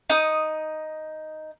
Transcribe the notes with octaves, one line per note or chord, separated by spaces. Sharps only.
D#4 D#6